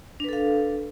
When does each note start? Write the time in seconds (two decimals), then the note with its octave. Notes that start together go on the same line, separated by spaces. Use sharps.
0.20 D4
0.24 B4
0.29 A4
0.33 F5